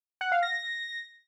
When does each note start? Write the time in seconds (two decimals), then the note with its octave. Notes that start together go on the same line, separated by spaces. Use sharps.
0.21 F#5
0.32 F5
0.43 A#6